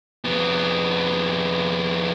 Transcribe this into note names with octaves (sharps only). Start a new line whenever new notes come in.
F2 B3